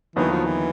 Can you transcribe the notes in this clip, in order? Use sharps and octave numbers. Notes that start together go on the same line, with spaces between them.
D#2 D3 E3 F#3 B3 D#4
F3
E3